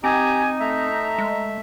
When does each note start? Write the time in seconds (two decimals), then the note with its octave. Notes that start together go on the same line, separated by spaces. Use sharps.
0.04 C4 D#4 G4 G#5 A#5
0.60 A3 E5 A#5
1.18 G#3